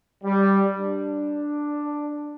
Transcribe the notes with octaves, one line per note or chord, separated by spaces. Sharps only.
G3
D4